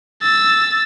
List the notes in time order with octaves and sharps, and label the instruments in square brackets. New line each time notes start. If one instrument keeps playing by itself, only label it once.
[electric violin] E6 A6